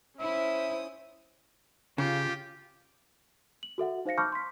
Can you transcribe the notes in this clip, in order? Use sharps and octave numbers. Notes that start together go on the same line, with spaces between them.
C#4 E4 C5 E5 D#6
C#3 F4 G4
F#7
F#4 A4 E5 F#5
D#4 C5 F5 A#6 C#7
A5 B5 C#6 D6 F6 G6
C6 B6